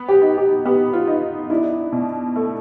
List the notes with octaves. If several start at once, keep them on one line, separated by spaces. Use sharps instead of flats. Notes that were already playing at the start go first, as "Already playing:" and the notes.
Already playing: B3
G4
D#4
G4
B3 G4
F4
D#4
D4 E4
B2
A3